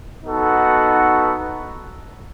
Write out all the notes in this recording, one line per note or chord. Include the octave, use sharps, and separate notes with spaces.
B3 D#4 F#4 A4